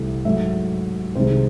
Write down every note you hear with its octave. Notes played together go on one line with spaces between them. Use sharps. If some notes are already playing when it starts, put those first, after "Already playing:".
Already playing: C2 C3 E3 A3
G#2 F#3 A3 E5
C2 C3 D#3 G#3 C5